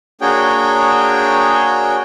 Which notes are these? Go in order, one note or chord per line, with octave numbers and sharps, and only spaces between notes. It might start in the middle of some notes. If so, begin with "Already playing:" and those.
A#3 D4 F#4 G#4 C#5 G5